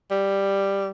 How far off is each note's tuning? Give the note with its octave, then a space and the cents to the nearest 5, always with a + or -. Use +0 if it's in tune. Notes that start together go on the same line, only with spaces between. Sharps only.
G3 +5